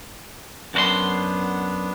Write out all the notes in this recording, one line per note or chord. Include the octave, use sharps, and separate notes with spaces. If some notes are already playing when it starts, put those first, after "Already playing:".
F#2 B3 D4 F#4 C6